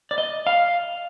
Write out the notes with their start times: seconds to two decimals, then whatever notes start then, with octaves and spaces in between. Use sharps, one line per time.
0.11 D5
0.18 D#5
0.47 F5